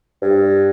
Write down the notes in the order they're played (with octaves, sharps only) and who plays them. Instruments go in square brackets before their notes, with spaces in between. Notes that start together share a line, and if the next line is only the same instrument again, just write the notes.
[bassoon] G2